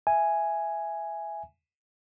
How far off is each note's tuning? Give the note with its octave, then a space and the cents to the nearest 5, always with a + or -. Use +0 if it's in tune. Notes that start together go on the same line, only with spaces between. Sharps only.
E5 +10 G#5 +0